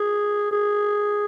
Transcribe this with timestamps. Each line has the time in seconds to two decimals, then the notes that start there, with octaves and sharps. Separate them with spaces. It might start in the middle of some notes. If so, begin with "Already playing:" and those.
Already playing: G#4
0.51 G#4